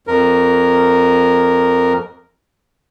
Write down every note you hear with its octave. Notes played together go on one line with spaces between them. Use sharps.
F2 A#4